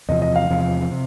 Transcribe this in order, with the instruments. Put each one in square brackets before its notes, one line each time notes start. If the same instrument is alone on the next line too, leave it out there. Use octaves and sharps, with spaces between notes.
[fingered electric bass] E2 C3 F3 [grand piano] D#5
[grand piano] D#5
F5
[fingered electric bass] E2 C3 F3
C3